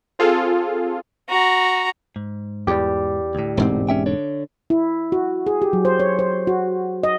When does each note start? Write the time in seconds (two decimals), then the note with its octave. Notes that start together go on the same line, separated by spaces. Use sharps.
0.19 C4 F4 G#4 A4
1.29 F#4 A#5
2.16 G#2
2.67 E2 G4 D5
3.35 D2 A2
3.57 E1 G#2 C4
3.89 C#4 E5 G5
4.06 D3 D4 C#5
4.70 E4
5.12 F#4
5.47 G#4
5.62 G4
5.73 F#3
5.85 C5
6.00 C#5
6.19 C5
6.47 F#4
7.03 D#5